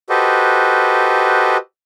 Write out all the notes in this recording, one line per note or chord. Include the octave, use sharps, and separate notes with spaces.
F#4 G4 A4 B4 C5 D#5